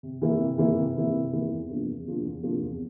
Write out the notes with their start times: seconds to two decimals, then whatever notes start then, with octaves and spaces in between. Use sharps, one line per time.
0.03 C3
0.22 E3 A#3 E4
0.40 C3
0.58 E3 A#3 E4
0.76 C3
0.96 E3 A#3 E4
1.14 C3
1.33 E3 A#3 E4
1.51 E2
1.70 C3 F3 A#3 D4
1.88 E2
2.07 C3 F3 A#3 D4
2.25 E2
2.43 C3 F3 A#3 D4
2.62 E2